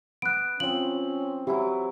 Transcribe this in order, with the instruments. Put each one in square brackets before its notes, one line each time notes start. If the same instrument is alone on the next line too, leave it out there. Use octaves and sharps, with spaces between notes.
[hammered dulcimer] B3 [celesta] F#6 D7
[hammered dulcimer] F3 C4 [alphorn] C#4 [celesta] F#7
[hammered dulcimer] E3 F#3 E4 [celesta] G4